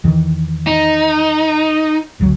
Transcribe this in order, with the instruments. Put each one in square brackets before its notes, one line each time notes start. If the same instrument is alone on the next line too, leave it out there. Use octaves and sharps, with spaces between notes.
[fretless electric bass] E2 D#3 E3
[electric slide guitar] D#4
[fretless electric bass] F#1 D2 F#3